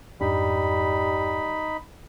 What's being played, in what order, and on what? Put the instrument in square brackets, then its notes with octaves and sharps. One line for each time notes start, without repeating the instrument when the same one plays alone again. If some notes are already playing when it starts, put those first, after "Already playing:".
[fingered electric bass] F2 G#2 D4 [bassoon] G3 [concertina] D#4 B5